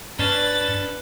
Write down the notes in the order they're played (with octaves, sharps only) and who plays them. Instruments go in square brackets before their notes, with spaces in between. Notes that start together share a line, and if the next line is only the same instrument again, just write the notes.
[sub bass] G2 [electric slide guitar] C#4 D4 [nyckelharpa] B4 [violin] A6